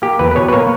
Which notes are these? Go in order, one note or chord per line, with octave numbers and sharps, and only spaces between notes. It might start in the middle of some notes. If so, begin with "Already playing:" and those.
A#3 G4
E2 B4
B4
B2 C#5
B4
A#3 C#5